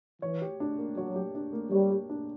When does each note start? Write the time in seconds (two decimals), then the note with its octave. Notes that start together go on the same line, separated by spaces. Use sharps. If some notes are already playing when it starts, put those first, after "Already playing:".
0.22 E3 C#5
0.42 G4
0.60 D4
0.79 A#3
0.97 F#3 C#5
1.16 G4
1.35 D4
1.53 A#3
1.71 G3 C#5
1.91 G4
2.10 D4